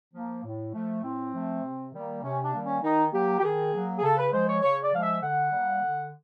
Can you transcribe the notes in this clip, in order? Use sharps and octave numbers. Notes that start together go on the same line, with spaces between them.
F3 A#3
A2
F3 A3
A2 C4
F3 A3
C3
D#3 G3 A#3
C3 C#4
D4
D#3 G3 A#3
C#4
D#3 D#4
F#3 A#3 G4
G4
D#3 G#4
F#3 A#3
G#4
C#3 A4
B4
F3 G#3 C5
C#5
C#3 C#5
D5
F3 G#3 F5
E5
D3 F#5
G3 A#3
D3